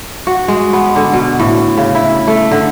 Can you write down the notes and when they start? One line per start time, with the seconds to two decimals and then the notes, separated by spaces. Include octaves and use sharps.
0.27 F#4
0.48 G#3
0.73 B3
0.96 D3
1.14 B2
1.40 A2
1.77 C#3
1.95 E4
2.27 A3
2.51 D3